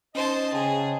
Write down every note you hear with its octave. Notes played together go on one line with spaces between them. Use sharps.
C#4 D#4 C5 D#5 A5
C#3 G#4 G5 A5